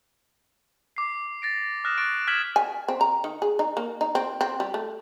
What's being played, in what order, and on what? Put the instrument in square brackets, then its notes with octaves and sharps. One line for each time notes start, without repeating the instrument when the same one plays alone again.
[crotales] D6 C7
A6 A#6 D7
D#6 F6 F#6 A#6 E7
C#6 F6 A6 D7
F6 G#6 B6 D7 E7 F#7
[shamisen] G#5
C4
A#5
D#3
G#4
D#4
A#3
D#4
C4
C4
G3
A3